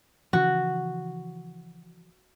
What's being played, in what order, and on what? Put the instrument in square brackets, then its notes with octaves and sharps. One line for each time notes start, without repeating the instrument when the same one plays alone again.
[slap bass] C#3 E3 F3 [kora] F#4